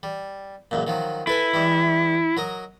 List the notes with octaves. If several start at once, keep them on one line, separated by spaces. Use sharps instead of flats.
G3
C#2 F#2 A#2
D#3 F3 F#3
E4 A4 B4 G#5
E3 G3 G#3
F#3 A#4 D#5